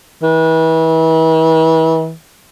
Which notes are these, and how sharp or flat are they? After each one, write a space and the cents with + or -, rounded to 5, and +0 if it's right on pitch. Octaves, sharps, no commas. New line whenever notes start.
E3 -35